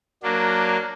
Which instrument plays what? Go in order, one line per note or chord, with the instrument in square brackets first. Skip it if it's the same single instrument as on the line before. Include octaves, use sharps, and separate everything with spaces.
[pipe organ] F#3 A#3 D4